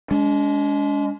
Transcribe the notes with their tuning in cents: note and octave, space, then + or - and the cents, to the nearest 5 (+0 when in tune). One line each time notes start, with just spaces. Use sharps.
G#3 +0 D4 -45